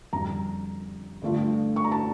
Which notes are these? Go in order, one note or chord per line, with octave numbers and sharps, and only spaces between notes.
F2 D3 G3 A#5
G2 D3 A3 D4 F4
C#6
A#5
A5